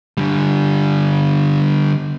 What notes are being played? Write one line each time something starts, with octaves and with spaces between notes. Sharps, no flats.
D3 G3